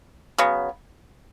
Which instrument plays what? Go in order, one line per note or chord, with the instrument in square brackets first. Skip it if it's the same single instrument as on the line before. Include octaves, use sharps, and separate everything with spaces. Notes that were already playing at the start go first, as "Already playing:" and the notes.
[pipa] C#3 F#3 B3